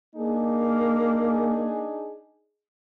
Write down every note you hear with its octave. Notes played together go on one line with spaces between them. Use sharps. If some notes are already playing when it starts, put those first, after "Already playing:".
A#3 D4 D#4 G#4